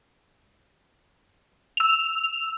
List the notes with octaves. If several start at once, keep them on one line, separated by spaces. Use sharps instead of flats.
E6 F7